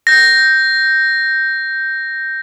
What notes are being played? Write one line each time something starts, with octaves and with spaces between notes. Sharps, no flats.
G6 A#6